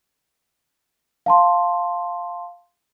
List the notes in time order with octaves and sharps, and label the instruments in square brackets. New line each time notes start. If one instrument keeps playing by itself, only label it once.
[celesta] F5 A5 C6